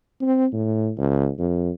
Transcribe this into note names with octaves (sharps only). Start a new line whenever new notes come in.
C4
A2
C#2
F2